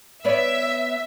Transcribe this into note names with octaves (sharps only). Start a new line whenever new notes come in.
B3 C#5 D5 E5